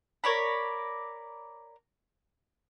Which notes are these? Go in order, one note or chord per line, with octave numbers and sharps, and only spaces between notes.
A#4 C#5 D5 B5